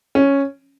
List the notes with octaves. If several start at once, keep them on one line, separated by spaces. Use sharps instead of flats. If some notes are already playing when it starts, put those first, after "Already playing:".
C#4